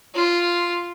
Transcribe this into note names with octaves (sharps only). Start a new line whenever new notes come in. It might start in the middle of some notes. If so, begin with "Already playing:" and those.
F4